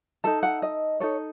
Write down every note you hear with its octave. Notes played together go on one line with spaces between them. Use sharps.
D#4 A4 A5
F#5
D#5
D#4 A4 C#5